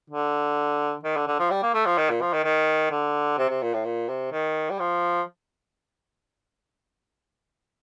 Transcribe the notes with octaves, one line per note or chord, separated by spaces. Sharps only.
D3
D#3
D3
D3
F3
G3
A#3
A3
F3
D#3
A#2
F3
D#3
D#3
D3
C3
C3
A#2
A2
A#2
C3
D#3
G3
F3